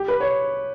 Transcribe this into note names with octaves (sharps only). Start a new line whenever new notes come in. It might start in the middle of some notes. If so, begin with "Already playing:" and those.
Already playing: G4
B4
C#5